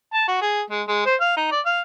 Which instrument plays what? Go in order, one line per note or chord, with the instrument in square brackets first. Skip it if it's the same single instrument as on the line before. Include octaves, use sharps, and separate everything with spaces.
[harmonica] A5
F#4
G#4
G#3
G#3
C5
F5
D#4
D5
F5